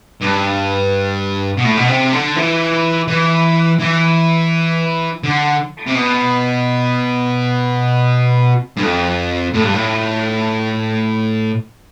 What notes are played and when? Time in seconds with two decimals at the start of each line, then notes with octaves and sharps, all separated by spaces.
0.21 G2
1.57 B2
1.64 A2
1.77 B2
1.88 C3
2.13 D3
2.36 E3
3.08 E3
3.80 E3
5.24 D3
5.86 C3
5.95 B2
8.77 G2
8.82 F2
9.54 A2
9.64 G2
9.74 A2